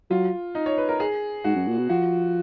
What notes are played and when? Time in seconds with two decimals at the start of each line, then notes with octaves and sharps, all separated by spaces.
0.10 F#3 F4
0.55 D#4
0.66 C#5
0.78 B4
0.89 A#4
1.00 G#4
1.44 G#2 F#4
1.56 F#2
1.68 A#2
1.78 B2
1.89 F3 F#4